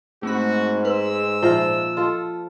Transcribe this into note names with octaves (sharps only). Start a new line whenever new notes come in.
G#2 A3 C4 F#4 B5
B4 C6 E6
A#2 F3 C5 D#5 E5 F6
F4 A4 D#5